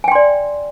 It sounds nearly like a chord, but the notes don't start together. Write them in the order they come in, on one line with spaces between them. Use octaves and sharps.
G#5 G5 C6 D5